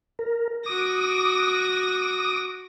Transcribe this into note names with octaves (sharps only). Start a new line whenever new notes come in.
A#4
F#4 D6 D#6 A#6